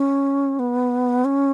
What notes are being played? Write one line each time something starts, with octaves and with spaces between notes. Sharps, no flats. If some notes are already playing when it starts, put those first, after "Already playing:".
Already playing: C#4
B3
C#4